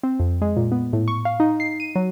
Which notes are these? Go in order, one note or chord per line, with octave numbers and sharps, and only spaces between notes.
C4
F2
G#3
A#2
B3
A2
C#6
F5
D#4
C7
D#7
F#3